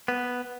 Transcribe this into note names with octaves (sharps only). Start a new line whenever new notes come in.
B3